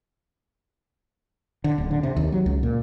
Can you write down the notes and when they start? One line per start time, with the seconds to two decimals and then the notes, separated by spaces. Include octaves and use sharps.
1.64 D3
1.78 D1
1.91 D3
2.03 C3
2.17 D#2
2.32 F#3
2.46 C#2
2.63 A#2